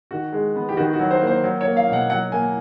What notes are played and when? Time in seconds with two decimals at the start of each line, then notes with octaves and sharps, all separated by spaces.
0.11 D#3 F#4
0.33 G#3
0.56 B3
0.69 G4
0.77 D#3 F#4
0.93 F#4
0.99 F#3
1.11 C5
1.21 A#3
1.27 C5
1.44 F#3
1.61 C#5
1.66 A#3
1.77 F5
1.88 B2 F#5
2.10 F#3 F#5
2.32 A#3 G#5